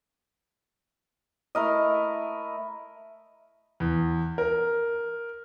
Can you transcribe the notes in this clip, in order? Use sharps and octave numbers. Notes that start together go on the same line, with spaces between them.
A3 E4 A#4 D#5
E2
A#4